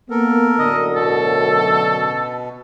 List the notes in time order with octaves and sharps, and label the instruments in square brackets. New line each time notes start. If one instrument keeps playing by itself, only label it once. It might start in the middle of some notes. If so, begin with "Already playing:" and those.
[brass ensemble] A#3 B3 [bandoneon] A4 A#4
[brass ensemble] F#2 A2 D3 [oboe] D#5
[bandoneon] B2 [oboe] A4